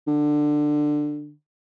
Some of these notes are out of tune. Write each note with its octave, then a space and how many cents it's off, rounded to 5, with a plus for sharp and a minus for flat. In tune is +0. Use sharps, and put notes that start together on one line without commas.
D3 +15